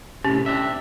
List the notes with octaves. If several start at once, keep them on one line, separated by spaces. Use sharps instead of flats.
A2 C3 C#4 G4
C4 D4 E5